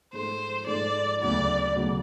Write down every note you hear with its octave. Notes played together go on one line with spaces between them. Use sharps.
G#2 F3 A3 C5
G#2 F3 A3 D5
D2 C#3 F#3 B3 D5
D2 C#3 F#3 B3